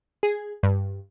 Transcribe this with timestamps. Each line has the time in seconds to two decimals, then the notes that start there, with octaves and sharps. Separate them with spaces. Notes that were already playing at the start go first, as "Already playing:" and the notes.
0.23 G#4
0.63 G2